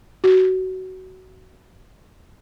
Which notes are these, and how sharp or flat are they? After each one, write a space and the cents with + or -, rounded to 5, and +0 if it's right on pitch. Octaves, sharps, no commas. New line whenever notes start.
F#4 +20